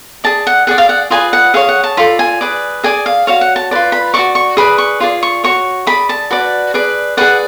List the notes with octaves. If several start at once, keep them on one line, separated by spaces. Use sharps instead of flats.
G#4 D5 A5
F#5
G#4 D5 F#5
F5
F#5
F4 G#4 B4 D5 G#5
F#5
G#4 C#5 F5
F#5
A5
F4 A4 D5 B5
G#5
G#4 B4 D5
G#4 D5 G#5
F5
F#4 C#5 F5
F#5
A5
F4 B4 D5
B5
F#4 A4 D5 C#6
C#6
G#4 B4 D5 B5
C#6
F4 G#4 D5
C#6
F#4 C#5 C#6
G#4 D5 B5
A5
F#4 B4 D5
G#4 B4 D5
G#4 B4 D5 F#5